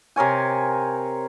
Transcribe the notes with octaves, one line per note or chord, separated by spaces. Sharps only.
C3 A#4 C#5 G#5